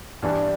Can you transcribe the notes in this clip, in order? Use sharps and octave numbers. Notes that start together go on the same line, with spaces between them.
G2 E3 G3 D4